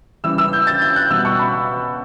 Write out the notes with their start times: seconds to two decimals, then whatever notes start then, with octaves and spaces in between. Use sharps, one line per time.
0.24 C#3 E3 G3 E6
0.38 E6
0.53 G6
0.67 A6
0.82 G6
0.96 F#6
1.10 B2 G3 E6
1.25 C#6
1.39 B5